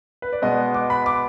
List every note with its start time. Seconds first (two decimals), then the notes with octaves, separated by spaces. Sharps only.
0.22 B4
0.33 D5
0.42 B2 G#3 B3 D#5
0.74 D6
0.90 B5
1.06 D6